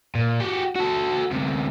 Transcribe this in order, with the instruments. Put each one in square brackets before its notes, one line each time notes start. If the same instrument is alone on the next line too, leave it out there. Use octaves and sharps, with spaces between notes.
[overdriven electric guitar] A#2
F#4 G4
F#4 A4
D2 C3